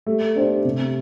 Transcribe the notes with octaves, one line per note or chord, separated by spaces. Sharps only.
G3 A3
D4 G4 C5
C3